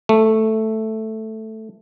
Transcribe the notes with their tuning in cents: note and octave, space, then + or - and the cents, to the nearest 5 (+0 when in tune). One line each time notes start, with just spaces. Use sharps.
A3 +0